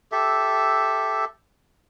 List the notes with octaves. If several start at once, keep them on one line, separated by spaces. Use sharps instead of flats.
G4 A4 E5